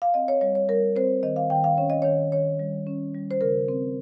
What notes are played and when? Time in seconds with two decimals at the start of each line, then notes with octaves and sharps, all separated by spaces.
0.02 F5
0.14 C4 D#5
0.28 C#5
0.41 G3 C#5
0.55 C#5
0.68 G3 A#4
0.96 C4 C5
1.23 D#3 D#5
1.36 F5
1.50 D#3 G5
1.64 F5
1.77 C#4 C#5
1.90 D#5
2.02 D#3 C#5
2.32 D#3 C#5
2.59 G3
2.87 C#4
3.14 G3
3.31 C5
3.41 C#3 A#4
3.69 C4